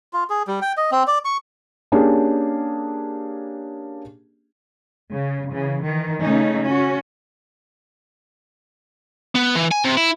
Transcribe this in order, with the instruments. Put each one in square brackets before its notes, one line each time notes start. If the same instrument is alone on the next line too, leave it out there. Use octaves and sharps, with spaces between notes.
[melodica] F4
G#4
G3
G5
D#5
C4
D5
C#6
[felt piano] A#3 C#4 D4 G4 G#4
[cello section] C#3
C#3 E3
D#3 E3
C#3 A3 C#4 D#4
C#4 F#4
[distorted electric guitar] B3
E3
G#5
C3
E4